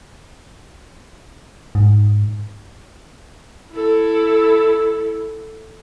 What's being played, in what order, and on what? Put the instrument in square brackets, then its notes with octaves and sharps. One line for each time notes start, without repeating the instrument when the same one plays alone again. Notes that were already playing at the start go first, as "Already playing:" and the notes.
[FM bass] G#2
[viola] E4 A4